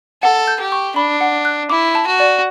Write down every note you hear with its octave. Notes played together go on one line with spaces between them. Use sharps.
A4 F#5
G6
G4
C#6
D4 B5
F#5
F#6
E4 D6
A5
F#4
D5